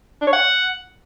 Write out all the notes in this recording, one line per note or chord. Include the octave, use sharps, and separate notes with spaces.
D4
C#5
F#5